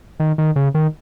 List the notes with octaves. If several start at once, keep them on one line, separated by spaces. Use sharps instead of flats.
D#3
D#3
C#3
D#3